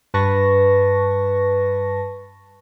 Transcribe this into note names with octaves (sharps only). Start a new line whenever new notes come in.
G2 B4 A5 C#6 A#6